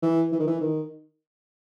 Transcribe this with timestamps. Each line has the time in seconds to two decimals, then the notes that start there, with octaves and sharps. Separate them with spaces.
0.02 E3
0.32 E3
0.39 D#3
0.47 E3
0.61 D#3